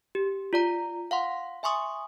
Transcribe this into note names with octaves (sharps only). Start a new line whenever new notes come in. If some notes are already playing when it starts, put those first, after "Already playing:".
G4
F4 D5 A#5
F5 F#5 C6
E5 G#5 C6 C#6 D#6